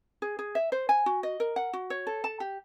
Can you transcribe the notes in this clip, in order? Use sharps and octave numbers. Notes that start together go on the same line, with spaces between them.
G#4
G#4
E5
C5
G#5
F#4
D#5
A#4
F#5
F#4
C#5
A4
A5
G4